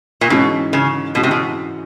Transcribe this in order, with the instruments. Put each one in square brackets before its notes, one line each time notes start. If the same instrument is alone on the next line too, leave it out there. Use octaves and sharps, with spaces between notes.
[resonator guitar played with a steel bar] A#2
[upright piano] G#2 E3 G#3 C#4 F#4 [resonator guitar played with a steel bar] B2
[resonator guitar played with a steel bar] C#3
[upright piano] G#2 E3 G#3 C#4 F#4 [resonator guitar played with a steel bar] B2
[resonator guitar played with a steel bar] C3
B2